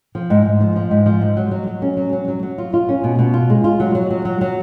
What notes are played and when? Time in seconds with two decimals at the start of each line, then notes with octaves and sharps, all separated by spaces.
0.15 F3
0.30 G#2
0.46 G#2
0.60 F3
0.76 F3
0.91 G#2
1.06 F3
1.21 G#2
1.37 F#3
1.51 F#3
1.67 F#3
1.82 C#4
1.97 F#3
2.13 F#3
2.28 F#3
2.43 F#3
2.58 F4
2.74 F4
2.89 C#4
3.04 B2
3.19 B2
3.34 F4
3.50 G#3
3.64 F4
3.80 F#3
3.95 F#3
4.10 F#3
4.25 F#3
4.41 F#3